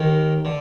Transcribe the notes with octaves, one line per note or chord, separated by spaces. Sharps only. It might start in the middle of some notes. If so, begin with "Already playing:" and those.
Already playing: D#2 D#3
D3